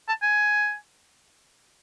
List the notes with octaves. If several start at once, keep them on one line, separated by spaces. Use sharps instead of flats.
A5
G#5